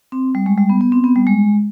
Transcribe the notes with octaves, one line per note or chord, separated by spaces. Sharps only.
C4
G3
G#3
G3
B3
B3
C4
B3
G3
G#3